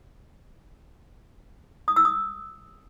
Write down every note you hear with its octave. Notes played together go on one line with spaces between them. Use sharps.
D#6
E6
D#6